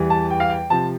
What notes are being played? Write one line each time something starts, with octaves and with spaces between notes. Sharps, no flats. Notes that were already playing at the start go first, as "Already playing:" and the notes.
Already playing: E2 E3 G3
A5
G5
F5
G5
C3 F3 A5